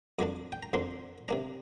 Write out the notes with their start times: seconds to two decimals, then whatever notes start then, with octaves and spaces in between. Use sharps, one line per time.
0.19 F2 F3 A#3 D4 D6
0.52 G5
0.63 A#5
0.73 F2 F3 A#3 D4 C6
1.28 C3 A#3 D4 A#5